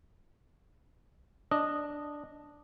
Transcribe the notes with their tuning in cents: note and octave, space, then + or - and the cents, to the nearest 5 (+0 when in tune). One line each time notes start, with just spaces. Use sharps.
D4 +0 D#5 -10